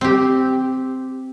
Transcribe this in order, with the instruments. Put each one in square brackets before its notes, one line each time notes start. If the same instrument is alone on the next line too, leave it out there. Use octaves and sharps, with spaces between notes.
[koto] C4 G4